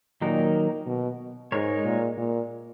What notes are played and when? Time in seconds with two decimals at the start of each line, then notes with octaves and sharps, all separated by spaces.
0.21 A#2 D#3 F#3 A#3 D#4 A#4
0.86 B2
1.52 G#2 G#3 D#4 A#4 C#5
1.85 A#2
2.17 A#2